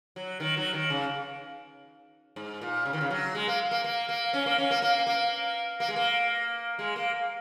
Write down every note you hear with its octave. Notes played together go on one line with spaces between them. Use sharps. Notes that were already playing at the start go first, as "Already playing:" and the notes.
F#3
D#3
F#3
D#3
C#3
G#2
A#2
C#3
D#3
C#3
F#3
G#3
A#3
A#3
A#3
A#3
C#4
A#3
C#4
A#3
A#3
A#3
A#3
G#3
A#3
G#3
A#3